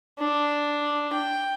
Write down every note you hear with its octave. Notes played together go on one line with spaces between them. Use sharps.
D4
G5